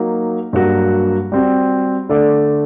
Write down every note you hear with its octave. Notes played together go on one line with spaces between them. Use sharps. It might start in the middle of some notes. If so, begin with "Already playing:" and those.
Already playing: F#3 A#3 D#4
G2 F#3 A#3 F#4
G3 C4 F#4
D3 A3 D4 A4 D5